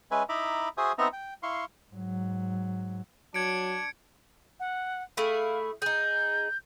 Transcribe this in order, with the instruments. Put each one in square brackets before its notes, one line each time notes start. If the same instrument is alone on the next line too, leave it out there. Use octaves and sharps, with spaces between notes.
[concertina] G#3 C#4 B4 E5 G#5
D#4 E4 E5 A#5 B5 D6
F#4 G#4 C5 E5 G#5 D#6
B3 C4 D#4 E5 A#5
G5
E4 F5 C6 C#6
[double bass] G#2 F#3
[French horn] F#3 [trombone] D4 [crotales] G#6 C#7 D7
[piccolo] F#5
[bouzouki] A3 E4 G#4 [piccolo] F5
[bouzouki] D#4 G#4 [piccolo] G6